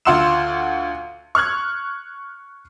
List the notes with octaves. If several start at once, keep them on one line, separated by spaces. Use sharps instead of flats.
D2 F4 F#5 C6 E6 E7
C#6 F6 F#6 G#6